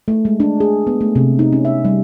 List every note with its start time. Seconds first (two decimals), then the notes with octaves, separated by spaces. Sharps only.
0.08 A3
0.25 G#3
0.40 D4
0.60 G#4
0.87 B3
1.01 A3
1.15 C3
1.39 D#4
1.53 C#4
1.65 E5
1.85 G3